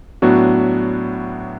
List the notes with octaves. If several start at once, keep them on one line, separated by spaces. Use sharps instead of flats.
A2 F#3 B3 D4 F#4